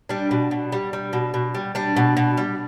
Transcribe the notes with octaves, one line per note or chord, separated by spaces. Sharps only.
G3 D4
B2
B2
G3
G3
B2
B2
G3
G3 D4
B2
B2
G3